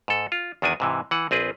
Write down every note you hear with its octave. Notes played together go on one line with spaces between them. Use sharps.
G#2 A4
F4
E2 D#3 D4 F#4 G#5
G#2 C3 E3
E3 F#5
A#1 C4 G#4 B4